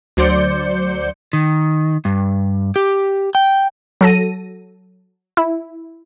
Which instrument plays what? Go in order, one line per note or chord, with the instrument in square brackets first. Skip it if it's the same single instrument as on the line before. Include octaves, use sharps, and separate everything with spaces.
[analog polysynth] D2 F#3 C5 D5 G6 C#7
[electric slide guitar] D#3
G2
G4
G5
[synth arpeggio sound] F#3 A4 A#6 D#7
E4